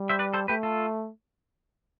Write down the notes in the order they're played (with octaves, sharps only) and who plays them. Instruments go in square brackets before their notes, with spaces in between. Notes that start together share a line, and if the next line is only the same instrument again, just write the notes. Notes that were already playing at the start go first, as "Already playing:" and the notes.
Already playing: [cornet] G3
[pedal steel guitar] C5 E5
B4 D5
A4 C5
[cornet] A3 [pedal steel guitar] G4 B4
[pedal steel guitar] F4 A4